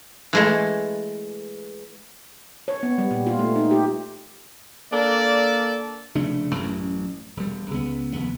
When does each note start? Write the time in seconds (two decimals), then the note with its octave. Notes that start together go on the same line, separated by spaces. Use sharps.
0.33 E3 G#3 A3
2.68 C#5
2.83 B3
2.98 G3
3.11 A#2
3.26 F4
3.39 A3
3.56 D#4
3.71 G4
4.91 A#3 D4 A4 D5
6.15 F1 C#3 A3 D4
6.55 A1 F#2
7.37 E1 G3
7.71 C#2 B3
8.13 F1 D#2 B3